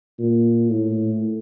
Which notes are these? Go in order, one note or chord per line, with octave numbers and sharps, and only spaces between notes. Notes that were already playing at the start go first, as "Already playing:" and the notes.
A#2
A2